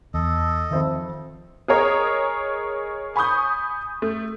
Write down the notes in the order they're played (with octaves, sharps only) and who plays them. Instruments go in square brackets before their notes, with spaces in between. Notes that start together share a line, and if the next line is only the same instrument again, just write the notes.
[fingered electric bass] E2 [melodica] A4 D#5
[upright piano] F2 C5 E5 [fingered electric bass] D#3
[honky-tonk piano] G#4 A#4 C#5 D#5 D#6
G#5 B5 C#6 D#6 G6
A3